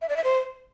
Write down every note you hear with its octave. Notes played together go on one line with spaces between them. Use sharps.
E5
D5
E5
C5